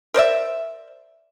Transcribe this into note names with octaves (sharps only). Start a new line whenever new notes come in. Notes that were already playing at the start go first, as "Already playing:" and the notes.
A#4 C5 D5 E5